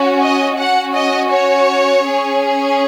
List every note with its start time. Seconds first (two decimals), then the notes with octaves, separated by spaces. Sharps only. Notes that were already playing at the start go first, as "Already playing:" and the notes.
Already playing: C#4 F#4
0.21 D#5
0.57 C#4 F#4 F#5
0.93 D#5
1.30 C#5
2.03 C#4 G#4